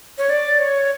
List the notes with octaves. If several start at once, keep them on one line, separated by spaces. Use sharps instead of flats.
C#5
D5
C#5